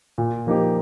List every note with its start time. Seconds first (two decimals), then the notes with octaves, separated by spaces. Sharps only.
0.18 A#2
0.47 F3 A#3 D#4 G4